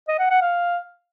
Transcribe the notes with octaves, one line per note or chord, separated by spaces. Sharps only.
D#5
F#5
F#5
F5